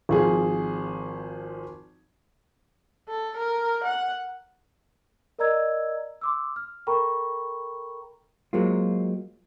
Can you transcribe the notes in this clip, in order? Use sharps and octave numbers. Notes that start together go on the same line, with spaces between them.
G#1 F3 G#4
A4
A#4
F#5
A#4 D5 D#5 A#5 E6 G#6
C6 D6 E6
F6
A4 A#4 G5 A#5 B5 C#6
F#3 G#3 A#3 C4 F4